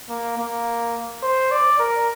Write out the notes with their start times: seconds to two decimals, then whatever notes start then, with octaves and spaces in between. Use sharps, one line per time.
0.09 A#3
0.38 A#3
1.23 C5
1.51 D5
1.79 A#4